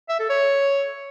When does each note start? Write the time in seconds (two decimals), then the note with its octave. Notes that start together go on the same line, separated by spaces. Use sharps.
0.09 E5
0.19 A4
0.30 C#5